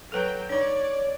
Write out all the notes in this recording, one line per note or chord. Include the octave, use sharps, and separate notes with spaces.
F#3 A4 B4 G5 A#5
D4 D#4 C#5 D5